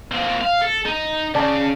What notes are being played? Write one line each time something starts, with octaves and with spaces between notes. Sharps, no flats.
A#3 C4
F5
A4
D#4
C#3 D5 A5